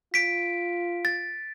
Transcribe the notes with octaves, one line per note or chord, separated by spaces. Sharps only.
F4 B6 D7
A6